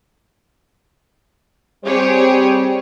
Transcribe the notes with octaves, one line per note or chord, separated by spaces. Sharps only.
G3 C4 G4 G#4 C5 C#5